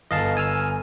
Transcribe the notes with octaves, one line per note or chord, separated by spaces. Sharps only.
G1 D#5 F5 A5
G#5 E6 F6